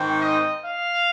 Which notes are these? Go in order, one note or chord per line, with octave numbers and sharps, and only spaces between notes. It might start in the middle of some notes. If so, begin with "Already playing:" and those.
Already playing: G#2 D#3 C4
D#5
F5